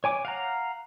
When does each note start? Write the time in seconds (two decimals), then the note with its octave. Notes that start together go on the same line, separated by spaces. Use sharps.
0.04 C#5 G#5 D6
0.25 F5 F#5 A#5